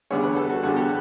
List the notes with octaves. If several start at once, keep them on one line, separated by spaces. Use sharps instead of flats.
E2 D3 G3 B3 C#5
B4
A4
F#4
E2 D3 G3 B3 F#4
G4